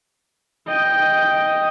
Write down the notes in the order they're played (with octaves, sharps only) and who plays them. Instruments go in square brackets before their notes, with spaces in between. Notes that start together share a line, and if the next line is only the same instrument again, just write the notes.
[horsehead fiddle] D#5 G5